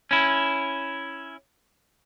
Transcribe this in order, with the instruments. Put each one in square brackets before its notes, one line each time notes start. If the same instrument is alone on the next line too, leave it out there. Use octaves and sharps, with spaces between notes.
[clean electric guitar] C#4 E4